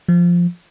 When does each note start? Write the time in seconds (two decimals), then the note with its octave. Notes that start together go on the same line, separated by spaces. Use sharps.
0.09 F3